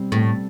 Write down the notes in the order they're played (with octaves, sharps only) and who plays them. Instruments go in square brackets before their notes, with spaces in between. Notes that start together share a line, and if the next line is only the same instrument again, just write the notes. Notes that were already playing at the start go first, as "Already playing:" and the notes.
Already playing: [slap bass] B2 G3 C4
[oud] A2